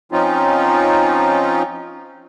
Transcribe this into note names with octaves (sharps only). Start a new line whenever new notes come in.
F3 C4 C#4 D#4 F4